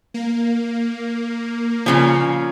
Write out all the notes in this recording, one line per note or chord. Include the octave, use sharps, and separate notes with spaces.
A#3
A#2 C#3 F3